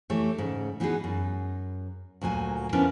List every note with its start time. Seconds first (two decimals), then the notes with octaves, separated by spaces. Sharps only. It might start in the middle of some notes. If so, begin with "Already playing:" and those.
0.10 E3 A3 G4 C#5
0.38 G#2 C#3
0.80 E3 B3 D#4 F#4 G#4
1.04 F#2
2.21 D2 A#2 F#3 G#5
2.73 F3 B3 C#4 D4 E4 A#4